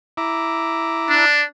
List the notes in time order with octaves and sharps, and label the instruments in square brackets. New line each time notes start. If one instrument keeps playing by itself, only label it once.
[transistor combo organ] E4 A#5 D6
[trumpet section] D4